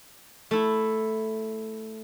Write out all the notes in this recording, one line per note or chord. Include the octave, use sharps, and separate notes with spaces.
A3 E4